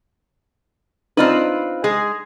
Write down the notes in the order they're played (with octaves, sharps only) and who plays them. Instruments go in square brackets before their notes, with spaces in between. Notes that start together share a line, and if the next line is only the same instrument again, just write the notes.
[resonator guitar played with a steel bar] C4 F4 B4 [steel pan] D4 D#4
[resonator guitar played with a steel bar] G#3 G#4